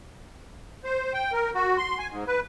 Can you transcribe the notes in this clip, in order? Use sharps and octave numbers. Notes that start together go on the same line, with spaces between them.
C5
G5
A#4
F#4
C6
G#5
G#2
B4